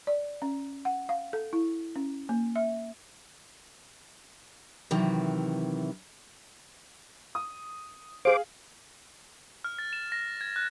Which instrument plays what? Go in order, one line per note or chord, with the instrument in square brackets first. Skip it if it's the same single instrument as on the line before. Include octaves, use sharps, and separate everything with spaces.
[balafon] D5
C#4
F#5
F5
A4
E4
C#4
A#3
E5
[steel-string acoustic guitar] C3 D#3 E3 F#3
[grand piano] D#6
[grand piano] G#4 F5 [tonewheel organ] C5 D6
[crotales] F6
A6
E7
A#6
G#6
F#6